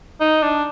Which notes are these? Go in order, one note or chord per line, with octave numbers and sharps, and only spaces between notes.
D#4
D4